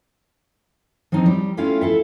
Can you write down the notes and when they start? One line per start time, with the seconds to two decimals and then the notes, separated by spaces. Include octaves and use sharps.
1.12 F3 C4 C#4 D#4
1.26 G3
1.57 A3 C#4 E4 F4 F5 G5
1.81 E4 A4 E5